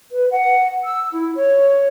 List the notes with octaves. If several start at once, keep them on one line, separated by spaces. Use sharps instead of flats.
B4
F#5
E6
E4
C#5